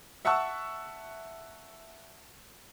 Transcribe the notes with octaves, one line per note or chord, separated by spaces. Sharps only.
E5 F#5 A5 C#6 E6